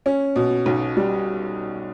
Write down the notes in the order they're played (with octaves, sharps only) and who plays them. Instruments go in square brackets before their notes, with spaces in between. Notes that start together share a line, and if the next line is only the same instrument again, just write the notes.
[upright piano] C#4
B2
B1
G3